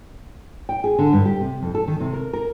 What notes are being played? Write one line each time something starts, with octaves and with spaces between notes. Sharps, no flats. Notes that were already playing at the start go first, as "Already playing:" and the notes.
G5
G#4
D3
G2
G4
C3
F2
A4
D#3
C3
A#4
A#4